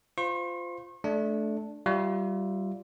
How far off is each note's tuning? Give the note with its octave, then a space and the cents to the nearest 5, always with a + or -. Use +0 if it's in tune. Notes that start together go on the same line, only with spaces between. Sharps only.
F4 +0 C5 -25 C#6 -45
A3 -20 D4 +0
G3 -20 F4 +0 E5 +0